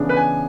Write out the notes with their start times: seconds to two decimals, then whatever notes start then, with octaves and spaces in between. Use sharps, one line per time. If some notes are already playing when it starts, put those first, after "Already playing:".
Already playing: C#3 E3 B3 D4
0.09 B4
0.17 G#5